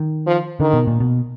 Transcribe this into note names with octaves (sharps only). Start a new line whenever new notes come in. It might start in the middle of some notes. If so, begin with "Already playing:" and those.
Already playing: D#3
F3
D3 D#3
B2
A#2
B2